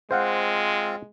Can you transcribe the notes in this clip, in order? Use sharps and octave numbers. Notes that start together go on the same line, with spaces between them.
G#3 C4 F4 C5 F5 F#5